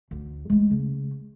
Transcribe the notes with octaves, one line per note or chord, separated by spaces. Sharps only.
D2
G#3 A3
C#3